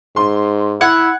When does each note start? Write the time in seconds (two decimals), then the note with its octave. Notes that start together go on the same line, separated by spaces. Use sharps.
0.16 G#2 C6
0.81 E4 F#5 G#6